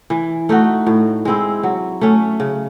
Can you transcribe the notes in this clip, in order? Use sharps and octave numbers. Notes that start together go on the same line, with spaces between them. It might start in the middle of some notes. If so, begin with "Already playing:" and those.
E3
A3 D#4 F#4
A2
G#3 C4 E4
F#3
A3 C#4
C#3